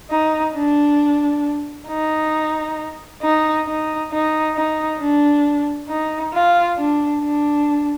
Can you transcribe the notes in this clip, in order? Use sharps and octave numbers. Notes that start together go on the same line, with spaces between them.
D#4
D4
D#4
D#4
D#4
D#4
D#4
D4
D#4
F4
D4
D4